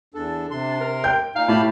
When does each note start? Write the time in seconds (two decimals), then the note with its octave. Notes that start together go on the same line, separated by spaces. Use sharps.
0.14 E2 D4 A4
0.51 C3 C6
0.81 A#4
1.04 G5 G6
1.35 A#2 D#4 F5
1.48 A2 G4 A5 B5